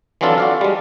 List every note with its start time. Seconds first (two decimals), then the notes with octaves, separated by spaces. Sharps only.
0.21 E3 F#3 C4 D4 F4 A4
0.38 F#4 D5 F5
0.61 G3 G#3